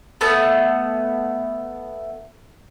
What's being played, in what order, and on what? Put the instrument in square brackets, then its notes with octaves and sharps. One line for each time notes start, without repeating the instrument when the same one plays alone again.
[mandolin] A3 B3 A5